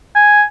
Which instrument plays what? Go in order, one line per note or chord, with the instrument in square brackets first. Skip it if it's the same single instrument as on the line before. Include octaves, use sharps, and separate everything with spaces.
[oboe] G#5